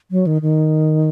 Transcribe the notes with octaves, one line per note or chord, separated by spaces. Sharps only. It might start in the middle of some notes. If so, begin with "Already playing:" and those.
F#3
D#3
D#3